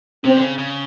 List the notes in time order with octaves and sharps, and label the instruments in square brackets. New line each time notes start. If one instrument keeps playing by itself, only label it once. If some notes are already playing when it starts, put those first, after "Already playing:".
[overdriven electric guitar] C3 [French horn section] C4
[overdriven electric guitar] D3
C#3
C#3